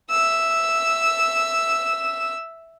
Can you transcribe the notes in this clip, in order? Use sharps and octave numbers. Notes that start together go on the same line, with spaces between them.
E5 E6